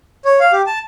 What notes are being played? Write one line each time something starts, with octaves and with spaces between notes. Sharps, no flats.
C#5
F5
G4
A5